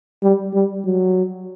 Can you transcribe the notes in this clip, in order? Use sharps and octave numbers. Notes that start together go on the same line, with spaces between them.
G3
G3
F#3